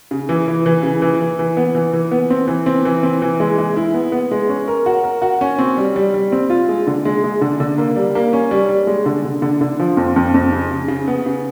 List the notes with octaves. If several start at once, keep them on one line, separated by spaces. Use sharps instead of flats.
C#3
E3
E3
E3
C#3
E3
E3
E3
B3
E3
E3
B3
C4
E3
C4
E3
C4
E3
G#3
G#3
E4
B3
B3
G#3
C#4
A#4
F#4
A#4
F#4
C#4
C4
G3
G3
G3
C4
F4
G#3
D3
G#3
G#3
D3
D3
A#3
G3
A#3
C#4
G3
G3
G#3
D3
D3
D3
D3
F3
F2
F2
F2
C#3
C#3
C#3
B3
C#3